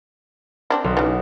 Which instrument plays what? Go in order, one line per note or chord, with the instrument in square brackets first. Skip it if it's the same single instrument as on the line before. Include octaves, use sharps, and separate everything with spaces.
[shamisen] C4 D4 E4
[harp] B1
[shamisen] C#3 E3